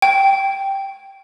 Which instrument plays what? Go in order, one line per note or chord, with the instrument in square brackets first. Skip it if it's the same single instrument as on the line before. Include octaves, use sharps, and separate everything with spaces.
[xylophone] G5